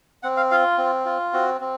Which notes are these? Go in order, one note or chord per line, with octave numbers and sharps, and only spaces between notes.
C4 F#5
F5
F4 F5
C4
F4
C4 F#4
C4